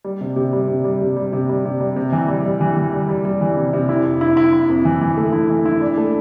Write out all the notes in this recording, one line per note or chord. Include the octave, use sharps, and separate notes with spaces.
G3
C3
C3
G3
C3
G3
C3
G3
C3
G3
C3
G3
C3
E3
G3
G3
E3
E3
G3
G3
G3
E3
C3
C3
E4
F2
E4
E4
E4
F2
E3
E3
A3
E4
E3
E4
D4
A3